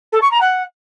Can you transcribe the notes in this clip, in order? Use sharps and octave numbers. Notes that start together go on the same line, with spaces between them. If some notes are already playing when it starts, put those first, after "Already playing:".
A4
C#6
A#5
F#5